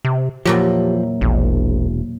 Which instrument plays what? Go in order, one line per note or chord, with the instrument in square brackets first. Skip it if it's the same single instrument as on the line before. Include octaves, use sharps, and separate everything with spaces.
[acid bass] C3
[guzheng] E2 A#2 F#3 [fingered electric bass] F3 [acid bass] G4
[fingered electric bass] E1 [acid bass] A#1